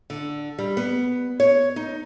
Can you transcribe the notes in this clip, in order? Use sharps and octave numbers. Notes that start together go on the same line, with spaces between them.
D3
G3
B3
C#5
D#4